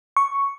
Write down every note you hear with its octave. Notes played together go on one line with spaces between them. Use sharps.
C#6